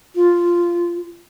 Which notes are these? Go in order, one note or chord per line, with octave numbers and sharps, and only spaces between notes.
F4